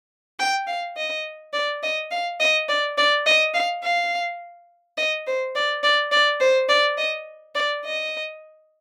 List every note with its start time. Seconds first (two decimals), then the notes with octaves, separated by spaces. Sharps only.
0.40 G5
0.67 F5
0.97 D#5
1.54 D5
1.83 D#5
2.11 F5
2.40 D#5
2.69 D5
2.98 D5
3.26 D#5
3.54 F5
3.84 F5
4.97 D#5
5.27 C5
5.55 D5
5.83 D5
6.12 D5
6.41 C5
6.69 D5
6.98 D#5
7.55 D5
7.85 D#5